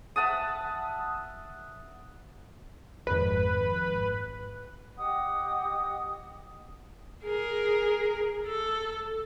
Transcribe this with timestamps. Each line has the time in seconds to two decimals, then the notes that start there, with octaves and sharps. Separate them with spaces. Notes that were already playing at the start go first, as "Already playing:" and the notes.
0.16 E5 F#5 A5 D#6
3.07 G#1 F2 G#2 B4
4.98 G4 D#5 F#5 D#6
7.24 G#4 A#4
8.47 A4